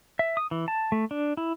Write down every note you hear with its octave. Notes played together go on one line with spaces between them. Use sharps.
E5
D#6
E3
A5
A3
D4
E4